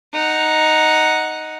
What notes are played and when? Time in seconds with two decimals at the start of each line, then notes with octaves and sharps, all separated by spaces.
0.14 D#4 F#5